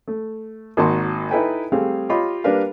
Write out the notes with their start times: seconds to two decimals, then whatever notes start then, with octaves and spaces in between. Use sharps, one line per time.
0.08 A3
0.77 G#1 A#3 D#4 F#4 A5 C6
1.30 D#4 E4 A4 B4 G5 G#5
1.72 G3 A3 C4 G#4 F5
2.10 F4 G4 C#5 D#5 F5 B5
2.44 G3 A#3 D4 A#4 B4 F5